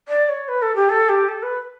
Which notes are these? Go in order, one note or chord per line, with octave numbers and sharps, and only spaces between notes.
D5
C#5
B4
A4
G4
A4
G4
A4
B4